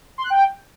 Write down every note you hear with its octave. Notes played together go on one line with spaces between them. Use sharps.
C6
F#6
G5